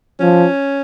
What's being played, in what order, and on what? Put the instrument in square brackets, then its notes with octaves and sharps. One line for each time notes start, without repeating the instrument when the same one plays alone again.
[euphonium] F3 [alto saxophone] C#4